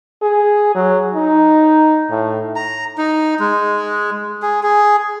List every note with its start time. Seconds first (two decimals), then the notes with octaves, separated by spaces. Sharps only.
0.23 G#4
0.75 F#3
1.14 D#4
2.10 A2
2.56 A#5
2.98 D#4
3.40 G#3
4.42 G#4
4.63 G#4